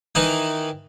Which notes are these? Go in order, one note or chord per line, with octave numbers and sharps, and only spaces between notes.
D#3 E3 D#4